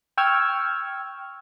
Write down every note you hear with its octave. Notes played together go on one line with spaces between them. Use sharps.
G5 C#6 E6 F6 G#6